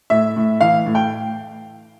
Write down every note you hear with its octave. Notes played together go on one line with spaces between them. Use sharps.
A2 E5
A2
E3 F5
A2
G5